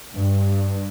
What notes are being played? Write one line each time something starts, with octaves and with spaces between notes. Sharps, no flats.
G2